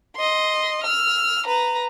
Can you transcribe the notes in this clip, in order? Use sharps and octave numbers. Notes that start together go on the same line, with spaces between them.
D#5 C6
E6 F6
B4 A#5